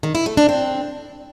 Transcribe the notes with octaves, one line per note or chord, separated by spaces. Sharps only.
D#3
E4
A3
D4
C4